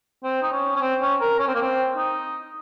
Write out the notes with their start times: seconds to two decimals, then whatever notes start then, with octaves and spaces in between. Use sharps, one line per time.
0.24 C4
0.42 D#4
0.52 C#4
0.76 C#4
0.81 C4
1.01 C#4
1.21 A#4
1.39 C#4
1.48 C4
1.55 A#3
1.61 C4
1.97 D#4